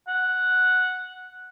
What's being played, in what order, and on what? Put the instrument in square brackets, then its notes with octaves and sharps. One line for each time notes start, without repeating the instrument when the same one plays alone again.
[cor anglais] F#5